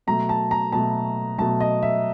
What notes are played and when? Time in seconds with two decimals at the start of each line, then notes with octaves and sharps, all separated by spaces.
0.07 B2 F#3 A3 A#5
0.29 A5
0.51 A#5
0.72 B2 F#3 A3 A5
1.38 B2 F#3 A3 A5
1.60 D#5
1.82 E5